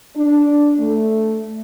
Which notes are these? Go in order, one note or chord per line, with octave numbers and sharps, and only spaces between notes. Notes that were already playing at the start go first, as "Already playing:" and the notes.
D4
A3